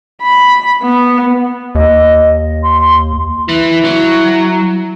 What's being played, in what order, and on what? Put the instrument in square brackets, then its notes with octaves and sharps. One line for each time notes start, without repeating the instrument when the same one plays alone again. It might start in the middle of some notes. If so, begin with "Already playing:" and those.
[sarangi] B5
B3
[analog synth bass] D#2 [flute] D#5
[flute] C6
[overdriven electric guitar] E3 [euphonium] E4
[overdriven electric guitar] F#3